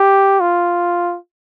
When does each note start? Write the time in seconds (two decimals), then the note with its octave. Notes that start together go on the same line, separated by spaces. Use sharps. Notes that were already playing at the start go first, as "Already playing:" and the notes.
Already playing: G4
0.40 F4